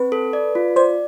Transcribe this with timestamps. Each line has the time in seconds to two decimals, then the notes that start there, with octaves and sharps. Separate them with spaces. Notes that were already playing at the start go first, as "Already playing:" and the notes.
Already playing: C4 B4
0.12 A4
0.33 D5
0.55 F4
0.76 C5 D5